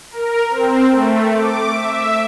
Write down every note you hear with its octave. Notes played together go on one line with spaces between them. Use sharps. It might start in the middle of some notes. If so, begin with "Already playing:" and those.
A#4
C4
A3
D6
E5